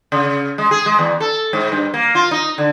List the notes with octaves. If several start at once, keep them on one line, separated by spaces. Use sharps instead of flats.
C#3
G#3
G#4
G#3
E2
A4
G#2
G2
A#3
F4
D#4
D3